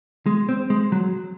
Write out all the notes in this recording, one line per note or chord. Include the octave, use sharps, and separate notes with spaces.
G#3
C4
G#3
F#3